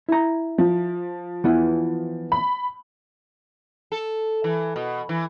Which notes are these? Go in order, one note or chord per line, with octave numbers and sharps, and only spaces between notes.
E4 A#5
F3
E3 B3 E4
B5
A4
E3
B2
E3